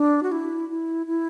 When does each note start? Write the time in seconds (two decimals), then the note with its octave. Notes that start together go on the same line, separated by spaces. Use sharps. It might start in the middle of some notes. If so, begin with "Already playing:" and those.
Already playing: D4
0.23 F#4
0.32 E4
0.69 E4
1.07 E4